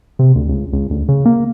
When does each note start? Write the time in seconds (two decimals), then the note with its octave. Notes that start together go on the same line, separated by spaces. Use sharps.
0.19 C3
0.35 D2
0.49 C#2
0.73 C#2
0.90 D2
1.08 C#3
1.25 A#3